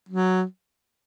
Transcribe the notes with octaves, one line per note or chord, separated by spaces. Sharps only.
F#3